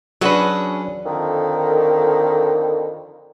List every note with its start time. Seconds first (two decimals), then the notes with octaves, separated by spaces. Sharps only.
0.21 F#3 C#4 D4 F#4 G#4 B4
1.05 F2 D3 D#3